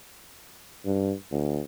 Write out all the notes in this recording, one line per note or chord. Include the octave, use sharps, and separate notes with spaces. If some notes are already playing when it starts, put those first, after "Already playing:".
G2
D2